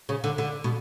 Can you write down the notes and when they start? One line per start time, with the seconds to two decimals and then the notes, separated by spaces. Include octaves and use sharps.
0.09 C#3
0.24 D3
0.38 D3
0.64 B2